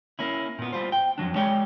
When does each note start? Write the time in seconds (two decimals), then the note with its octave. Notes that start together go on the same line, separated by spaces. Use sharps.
0.19 A#3 C#4 E4
0.59 A#2 B3
0.72 G3 F4 C5
0.92 G5
1.18 F2 C#3 F#3 D4
1.36 G#3 G4 C#5 D5 G5